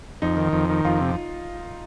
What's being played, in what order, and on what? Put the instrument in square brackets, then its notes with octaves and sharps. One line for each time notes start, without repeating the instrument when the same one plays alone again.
[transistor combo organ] F2 [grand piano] D#4
[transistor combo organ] D#3
F2
D#3
[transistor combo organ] F2 [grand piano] F4
[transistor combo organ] C3